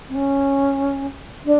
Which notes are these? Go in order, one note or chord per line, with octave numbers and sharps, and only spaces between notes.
C4
C#4
D4